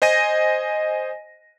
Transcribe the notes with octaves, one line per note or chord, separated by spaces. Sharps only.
C5 D#5 G#5 A#6 D#7